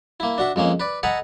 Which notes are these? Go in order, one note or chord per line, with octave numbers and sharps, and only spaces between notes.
A#3 E4
D4 F#4 E5
F2 G#3 A#3 C#4
B4 D5
A4 D#5 F#5 G#5 A#5 B5